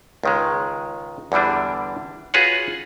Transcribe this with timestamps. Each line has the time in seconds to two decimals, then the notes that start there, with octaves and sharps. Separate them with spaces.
0.24 C#2 D#3 G#3
1.32 E2 D3 E3 G3 D4
2.34 F4 F#4 G#4 B4 C#5 F#5